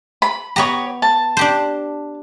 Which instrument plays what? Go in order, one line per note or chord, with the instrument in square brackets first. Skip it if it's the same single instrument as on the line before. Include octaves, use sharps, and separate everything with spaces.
[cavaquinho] B5
[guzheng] B3 A#5 [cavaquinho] G4 C#5
[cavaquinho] A5
[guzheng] D4 G4 C5